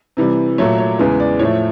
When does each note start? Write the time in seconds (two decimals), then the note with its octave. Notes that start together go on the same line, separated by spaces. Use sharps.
0.17 C3 E3 G3
0.58 A#2 F#3 A3 C#5
0.78 C#5
0.99 E2 C#3 E3 G#3
1.20 D5
1.39 A2 F3 A3 C#5